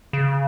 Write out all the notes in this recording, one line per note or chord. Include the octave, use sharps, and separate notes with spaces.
C#3